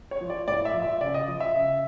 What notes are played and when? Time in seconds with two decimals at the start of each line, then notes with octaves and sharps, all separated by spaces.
0.11 C#5
0.21 F3
0.30 D5
0.48 A2 D5
0.65 E5
0.73 F3
0.82 E5
1.01 C#3 D5
1.14 D#5
1.27 F3
1.40 E5
1.54 C#3